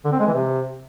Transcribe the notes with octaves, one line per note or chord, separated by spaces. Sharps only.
D3
C4
G#3
E3
C3